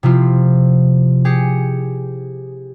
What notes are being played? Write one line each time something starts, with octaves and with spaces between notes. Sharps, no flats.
C3 F3 E4 F4
G4 G#4 C7 C#7